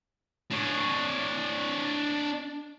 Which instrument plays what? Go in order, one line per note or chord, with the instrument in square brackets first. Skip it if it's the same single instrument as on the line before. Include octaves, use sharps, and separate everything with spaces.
[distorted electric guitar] D4 C#5